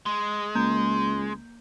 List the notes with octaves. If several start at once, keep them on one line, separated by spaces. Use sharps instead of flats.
G#3
C#2 A#3 G6